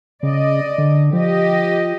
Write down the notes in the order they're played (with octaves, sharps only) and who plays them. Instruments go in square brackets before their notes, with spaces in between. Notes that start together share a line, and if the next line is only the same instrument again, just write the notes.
[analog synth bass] C#3 [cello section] D5 D#5
[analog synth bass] D3
[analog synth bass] F3 [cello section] G4 D#5